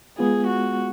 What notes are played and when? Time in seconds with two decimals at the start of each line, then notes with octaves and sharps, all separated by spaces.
0.18 G#3 B3 F4 G#4
0.47 F#4